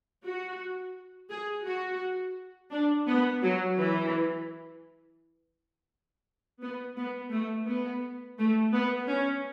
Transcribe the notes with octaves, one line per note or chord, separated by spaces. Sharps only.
F#4
G#4
F#4
D4
B3
F#3
E3
B3
B3
A3
B3
A3
B3
C#4